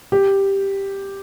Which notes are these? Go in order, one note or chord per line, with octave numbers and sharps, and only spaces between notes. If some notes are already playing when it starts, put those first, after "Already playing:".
G4